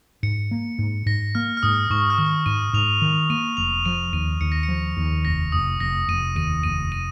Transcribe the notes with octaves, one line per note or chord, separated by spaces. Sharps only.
G#2 C#7
A#3
G#2
G#2 A#6
A#3 F6
F6
G#2 D#6
G#2 C#6
F6
D#3 D#6
G#2 D#7
G#2 F7
D#3
A#3 D#7
F1 F7
F3 D#7
D#2 D#7
D#2 C#7
A#6
C#7
F3
D#2
F1 A#6
F1 D#6
F1 A#6
F1 D#7
D#2 D#7
F1 D#7
D#7